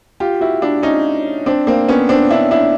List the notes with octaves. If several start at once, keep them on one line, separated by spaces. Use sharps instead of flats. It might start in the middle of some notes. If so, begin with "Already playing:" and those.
F4 G4
E4 F#4
D4 E4
C#4 D#4
C4 D4
A#3 C4
B3 C#4
C4 D4
D4 E4
D4 E4